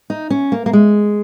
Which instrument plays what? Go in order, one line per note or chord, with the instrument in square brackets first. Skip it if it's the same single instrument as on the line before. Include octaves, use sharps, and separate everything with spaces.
[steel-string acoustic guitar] D#4
C#4
A#3
A#3
G#3